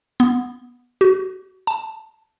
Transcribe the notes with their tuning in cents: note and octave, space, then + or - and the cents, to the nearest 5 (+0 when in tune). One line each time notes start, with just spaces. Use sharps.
B3 -15
F#4 +20
A5 -5